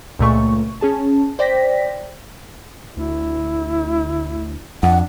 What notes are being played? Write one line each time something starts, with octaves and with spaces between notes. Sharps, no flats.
C#2 A#2 A3 C#6
C#4 G#4 A5
C5 D5 G5 A#6 B6
D2 E4
F2 D4 F#5